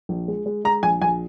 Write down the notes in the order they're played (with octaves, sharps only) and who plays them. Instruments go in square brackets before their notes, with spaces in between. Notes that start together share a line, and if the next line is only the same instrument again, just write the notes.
[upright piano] A#1
G#3
G#3
G#3 A#5
A#1 G#5
A#1 G#5